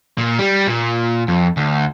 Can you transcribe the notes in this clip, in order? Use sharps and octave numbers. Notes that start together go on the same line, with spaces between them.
A#2
G3
A#2
F2
D2